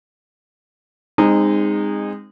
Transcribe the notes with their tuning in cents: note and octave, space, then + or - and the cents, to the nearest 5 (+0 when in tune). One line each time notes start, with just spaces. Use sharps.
G#3 -25 C4 +0 D#4 -15